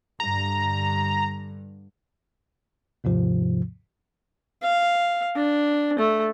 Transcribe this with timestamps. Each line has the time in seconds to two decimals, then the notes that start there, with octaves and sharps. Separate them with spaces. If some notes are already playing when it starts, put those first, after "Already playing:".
0.20 G2 D3 A#5
3.04 D#2 G#2 C3 F3
4.63 F5
5.36 D4
5.99 A3